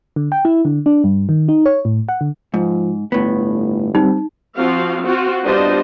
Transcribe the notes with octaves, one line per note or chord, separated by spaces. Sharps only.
D3
G5
E4
D3
D4
G2
D#3
D#4
C#5
A2
F#5
D3
G#2 F3
G1 A2 B3
G3 C4 D#4
F3 C4 F#4 F5
C4 F4 F#4 C5
G3 B3 D4 F4 C5 D#5